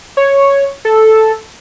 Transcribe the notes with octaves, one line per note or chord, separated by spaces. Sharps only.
C#5
A4